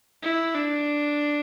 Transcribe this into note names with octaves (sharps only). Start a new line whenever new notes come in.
E4
D4